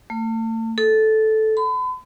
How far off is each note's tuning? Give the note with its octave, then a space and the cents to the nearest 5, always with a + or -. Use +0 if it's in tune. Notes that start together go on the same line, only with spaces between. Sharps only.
A3 +40
A4 -10
B5 +40